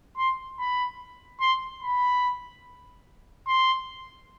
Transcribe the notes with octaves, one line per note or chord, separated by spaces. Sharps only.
C6
B5
C6
B5
C6